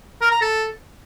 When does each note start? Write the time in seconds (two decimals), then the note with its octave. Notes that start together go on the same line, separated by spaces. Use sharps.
0.21 A#4
0.31 A#5
0.41 A4